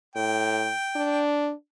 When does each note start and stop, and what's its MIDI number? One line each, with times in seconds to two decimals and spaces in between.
0.15 0.71 45
0.15 1.21 79
0.96 1.52 62